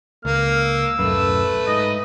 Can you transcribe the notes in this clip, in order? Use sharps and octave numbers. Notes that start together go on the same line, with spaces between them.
C#2 A#3 F6
E6
D1 B1 F#2 A3 B4
G#2 D#5